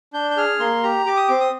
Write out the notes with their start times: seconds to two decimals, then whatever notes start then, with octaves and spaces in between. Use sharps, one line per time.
0.13 D4 G6
0.31 G6
0.37 G#4 F6
0.60 A#3 C6
0.83 G4 A#5
1.06 G4 D6
1.17 D#6
1.28 C4 D6
1.40 D#6